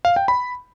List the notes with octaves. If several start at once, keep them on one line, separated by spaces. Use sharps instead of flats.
F5
G5
B5